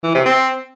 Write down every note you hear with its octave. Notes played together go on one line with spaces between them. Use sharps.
E3
C3
C4